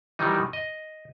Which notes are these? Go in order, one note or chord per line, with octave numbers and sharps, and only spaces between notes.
D#3 E3 F#3 G3 D#4
D#5